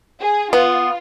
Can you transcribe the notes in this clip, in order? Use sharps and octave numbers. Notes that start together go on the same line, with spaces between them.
G#4
B3 F4